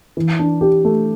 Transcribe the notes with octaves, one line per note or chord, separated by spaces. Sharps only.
E3
D4
G4
A3